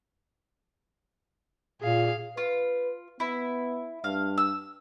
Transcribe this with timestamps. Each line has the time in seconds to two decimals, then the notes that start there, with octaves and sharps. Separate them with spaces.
1.82 A#2 G#4 F5
2.37 F4 B4
3.20 B3 E4
4.04 G2 F5
4.38 E6